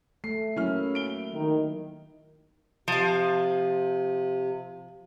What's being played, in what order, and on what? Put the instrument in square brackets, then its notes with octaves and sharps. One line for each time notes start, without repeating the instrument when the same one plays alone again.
[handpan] A3 [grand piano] C7
[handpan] F#3 A#3 E4 [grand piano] C#4 F6
[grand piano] D7 G7
[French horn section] D#3
[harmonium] C3 [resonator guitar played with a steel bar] F3 F5